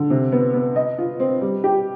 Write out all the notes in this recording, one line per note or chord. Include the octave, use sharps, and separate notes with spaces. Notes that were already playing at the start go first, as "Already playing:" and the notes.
Already playing: D3
C3
B3
B3
D#5
F4
C4
G3
G4